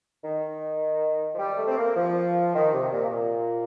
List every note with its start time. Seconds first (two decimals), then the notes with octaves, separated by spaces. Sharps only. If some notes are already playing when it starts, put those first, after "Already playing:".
0.24 D#3
1.35 F3
1.39 G3
1.58 A3
1.67 C4
1.78 A#3
1.97 F3
2.55 D#3
2.73 C3
2.93 A#2
3.11 A#2